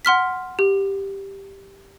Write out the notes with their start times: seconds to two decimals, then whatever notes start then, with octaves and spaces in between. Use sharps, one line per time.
0.05 F#5 C6 F6 B6
0.59 G4